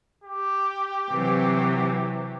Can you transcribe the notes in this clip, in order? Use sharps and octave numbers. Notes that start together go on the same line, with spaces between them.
G4
C3 E3 F#3